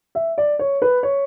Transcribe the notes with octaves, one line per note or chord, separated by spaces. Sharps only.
E5
D5
C#5
B4
C#5